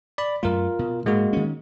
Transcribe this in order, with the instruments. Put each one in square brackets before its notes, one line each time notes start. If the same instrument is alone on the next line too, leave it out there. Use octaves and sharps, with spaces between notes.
[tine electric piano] D5 B5
[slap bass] F#2 A3 [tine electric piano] F4 A#4
[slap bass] B2
[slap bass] G#2 [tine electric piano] G#3 A#3 F#4
[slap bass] D#3 C#4